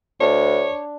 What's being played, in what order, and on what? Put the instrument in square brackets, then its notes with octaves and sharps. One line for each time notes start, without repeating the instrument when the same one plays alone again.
[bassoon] D2 [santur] D4 [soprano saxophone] C#5